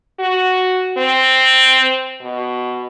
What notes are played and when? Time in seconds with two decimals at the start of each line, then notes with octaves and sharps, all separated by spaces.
0.20 F#4
0.97 C4
2.22 B2